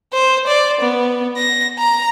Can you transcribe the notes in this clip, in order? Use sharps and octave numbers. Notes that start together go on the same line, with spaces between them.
C5
D5
B3
A#6
A#5